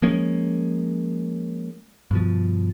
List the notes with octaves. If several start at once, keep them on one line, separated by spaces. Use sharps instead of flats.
F3 G#3 A#3 C#4
G2 B2 F3